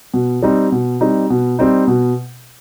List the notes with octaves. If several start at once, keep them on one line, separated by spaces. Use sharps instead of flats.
B2
G3 C4 D#4
B2
G3 C4 D#4
B2
G3 C4 D#4
B2